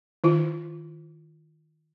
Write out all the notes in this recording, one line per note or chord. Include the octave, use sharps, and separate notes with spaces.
D#3 E4 F4